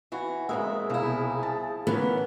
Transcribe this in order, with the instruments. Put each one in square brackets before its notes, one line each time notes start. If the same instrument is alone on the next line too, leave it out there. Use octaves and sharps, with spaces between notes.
[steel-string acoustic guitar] E3 F#4
[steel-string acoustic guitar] F2 D#3 E5 [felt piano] G#3 A#3 [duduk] G#4
[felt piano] C2 B2 [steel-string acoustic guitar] F3 E4
[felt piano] A5
[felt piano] E3 A#3 C#4 [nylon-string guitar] B3